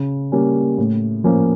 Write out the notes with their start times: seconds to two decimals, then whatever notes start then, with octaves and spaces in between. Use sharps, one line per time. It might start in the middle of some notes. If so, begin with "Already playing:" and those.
Already playing: C#3
0.32 G3 A#3 C#4
0.78 A2
1.24 F3 A#3 C#4